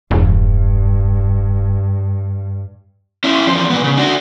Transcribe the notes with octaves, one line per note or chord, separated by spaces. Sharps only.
E1 G2
C#4 E4
E2 F3
A#2 B3
C#3
D4 F#4